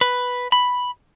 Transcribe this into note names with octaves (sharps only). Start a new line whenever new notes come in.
B4
B5